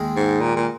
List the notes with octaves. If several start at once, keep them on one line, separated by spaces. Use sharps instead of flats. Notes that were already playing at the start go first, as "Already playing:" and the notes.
Already playing: D#2 D#3 G#3
G#2
A#2
A#2